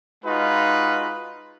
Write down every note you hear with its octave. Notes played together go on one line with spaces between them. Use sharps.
G#3 D#4 F4 F#4 B4